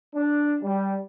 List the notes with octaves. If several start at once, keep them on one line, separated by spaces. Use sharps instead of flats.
D4
G3